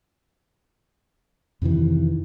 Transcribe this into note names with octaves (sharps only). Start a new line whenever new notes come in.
F2 C3 D#3 E3